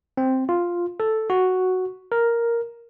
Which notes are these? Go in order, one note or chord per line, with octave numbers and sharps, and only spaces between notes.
C4
F4
A4
F#4
A#4